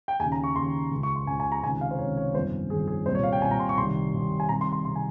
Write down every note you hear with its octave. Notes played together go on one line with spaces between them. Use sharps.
G5
D#2 C#3 G#5
A#5
C#6
D#2 C#3 C6
C#2 C#3
C#6
C6
C#2 C#3 G#5
G#5
A#5
C#2 C3 D#3 G#5
F5
C5
C#2 C3 D#3 C#5
C#5
G1 F2 D#3 C5
G1 F2 D#3 G#4
G#4
C2 A#2 C5
C#5
F5
G5
C2 A#2 G#5
A#5
C6
C#6
C2 C3 D#3 C6
C2 C3 D#3
G#5
C2 C3 D#3 A#5
C6
C6
C3 D#3 C6
G#5